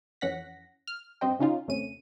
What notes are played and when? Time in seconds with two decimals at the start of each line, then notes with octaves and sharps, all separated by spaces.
0.21 F2 E3 C#4 F#5 A#6 B6
0.87 F6
1.21 G2 C4 C5 D#5 G5
1.39 C#3 C#4 D#4 F4
1.68 D#2 C3 A3 C#4 D#7